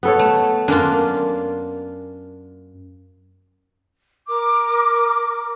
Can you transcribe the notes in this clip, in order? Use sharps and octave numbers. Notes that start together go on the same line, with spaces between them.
B3 A4 C#5
A3
F#2 A#3 D4 F4
A#4 D6